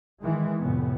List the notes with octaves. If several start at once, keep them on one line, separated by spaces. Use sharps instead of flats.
D#3 E3 G#3
F1 A2 B3